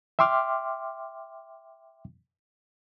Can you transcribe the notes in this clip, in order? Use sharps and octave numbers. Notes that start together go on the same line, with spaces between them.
E5 G5 C6 D6 F6